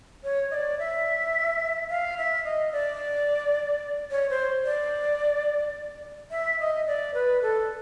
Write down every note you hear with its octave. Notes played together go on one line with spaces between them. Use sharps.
C#5
D#5
D5
E5
F5
E5
D#5
D5
C#5
C5
D5
E5
D#5
D5
B4
A4